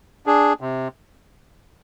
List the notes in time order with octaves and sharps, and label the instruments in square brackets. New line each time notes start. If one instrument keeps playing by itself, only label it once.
[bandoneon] D4 G#4
C3